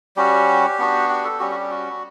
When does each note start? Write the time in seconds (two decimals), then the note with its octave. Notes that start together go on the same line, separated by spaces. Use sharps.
0.16 G3 C#4 F#4 G4
0.79 B3 D4 F#4
1.09 G4
1.24 A4
1.40 G3 C#4 F#4 G4
1.51 F#4
1.55 G4
1.71 F#4